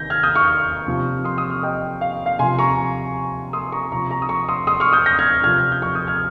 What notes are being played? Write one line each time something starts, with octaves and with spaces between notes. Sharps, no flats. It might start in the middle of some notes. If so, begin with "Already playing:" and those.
Already playing: C3 D#3 G6 A#6
F6 G#6
D#6 G6
C#6 F6
C3 F3
C6 D#6
C6 D#6
C#6 F6
D#5 G5
F5
F5
C3 F3 G#5 C6
A#5 C#6
C6 D#6
A#5 C#6
C3 F3 A#5 C#6
A#5 C#6
D#6
A#5 C#6
C6 D#6
C6 D#6
C#6 F6
D#6 G6
G6 A#6
F6 G#6
C3 F3 F6 G#6
G6
C#6 F6
D#6 G6
F6 G#6